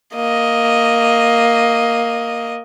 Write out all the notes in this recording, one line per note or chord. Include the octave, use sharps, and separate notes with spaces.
A#3 D#5